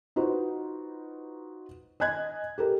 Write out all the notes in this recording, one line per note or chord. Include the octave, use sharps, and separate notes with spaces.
D#4 F4 F#4 B4 C5
D#5 G#5 F#6 G#6
G4 A4 A#4